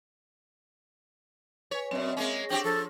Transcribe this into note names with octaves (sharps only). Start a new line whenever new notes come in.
B4 C#5 G#5
F#2 B2 C4 E5
G#3 A#3 C#4
C4 D4 F4 G4 G5 C#6
F3 A4